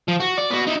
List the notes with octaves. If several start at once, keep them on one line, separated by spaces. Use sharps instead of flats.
F3
F#4
D5
B3 F#4
D#4 E4